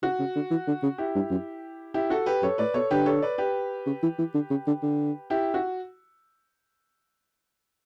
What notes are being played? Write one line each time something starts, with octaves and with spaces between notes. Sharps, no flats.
C#3 F#4
C#3
D3
E3
D3
C#3
E4 G4
G2
F#2
E4 G4
F#4 A4
G4 B4
F#2 A4 C#5
A2 B4 D5
B2 A4 C#5
D3 G4 B4
A4 C#5
B4 D5
G4 B4
C#3
E3
E3
D3
C#3
D3
D3
E4 G4
F#4